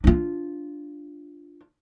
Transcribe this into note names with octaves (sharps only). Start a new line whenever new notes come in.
D4 F4